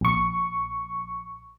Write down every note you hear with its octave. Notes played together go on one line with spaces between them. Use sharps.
A#1 C#6